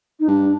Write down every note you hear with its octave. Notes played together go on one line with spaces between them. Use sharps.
D#4
G2 D4